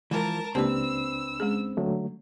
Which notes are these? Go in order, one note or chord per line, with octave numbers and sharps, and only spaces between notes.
E3 F3 G#3 A#4 A5
C#2 A#3 C4 D4 G4 B4 A5 E6
G#3 C#4 G#4
D3 F#3 A3